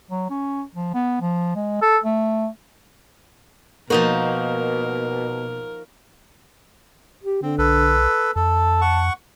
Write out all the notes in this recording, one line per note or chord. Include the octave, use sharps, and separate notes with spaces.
F#3
C#4
F3
B3
F3
G#3
A4
A3
B2 F3 A#3 D#4 F#4 A#4
G4
D3 C4
B1 A4 B4
F2 A4 A5
F#5 C#6